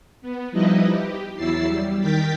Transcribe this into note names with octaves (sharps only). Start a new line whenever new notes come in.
B3
F3 G3 D#4 E4 B4 D#5
G4
E2 F#3 E4 E6 A6 C7
G3
D#3 A#4 G5 G6 A6 B6